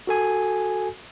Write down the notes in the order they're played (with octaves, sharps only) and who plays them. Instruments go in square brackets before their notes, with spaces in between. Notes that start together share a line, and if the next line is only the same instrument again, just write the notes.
[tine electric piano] F#4 A4 G#5